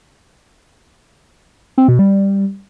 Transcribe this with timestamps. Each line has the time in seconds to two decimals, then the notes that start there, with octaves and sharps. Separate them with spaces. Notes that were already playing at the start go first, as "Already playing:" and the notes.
1.78 C4
1.88 B2
1.99 G3